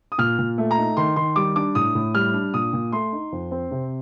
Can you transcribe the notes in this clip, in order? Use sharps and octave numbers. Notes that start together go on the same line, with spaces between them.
D#6
A#2 F6
A#2
A3
A#5
D#4
D#3 C6
D#3 C6
G3 D6
D4 D6
A2 D#6
A2
G3 F6
D4
A#2 D#6
A#2
A3 C6
D#4
F2
C4
C3